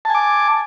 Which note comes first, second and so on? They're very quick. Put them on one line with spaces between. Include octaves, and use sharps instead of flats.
A5 G#5 D6